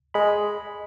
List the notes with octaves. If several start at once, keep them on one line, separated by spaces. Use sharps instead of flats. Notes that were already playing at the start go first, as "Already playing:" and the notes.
G#3 B5